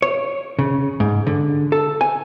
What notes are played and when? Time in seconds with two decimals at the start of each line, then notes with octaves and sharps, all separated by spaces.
0.02 C#5
0.59 C#3
1.00 G#2
1.27 D3
1.72 A4
2.01 G#5